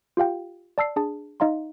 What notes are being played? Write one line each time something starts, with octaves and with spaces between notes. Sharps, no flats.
F4 G4 F5 G5
D5 A5 E6 C7
D4 G#4 A5
D#4 D#5 F5 A#5 C6